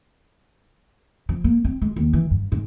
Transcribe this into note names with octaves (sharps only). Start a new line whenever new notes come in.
F3
A#3
C4
G#3
D#2
E3
G2
G#2